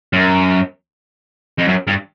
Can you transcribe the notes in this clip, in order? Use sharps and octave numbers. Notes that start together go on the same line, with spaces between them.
F#2
F2
F#2
G2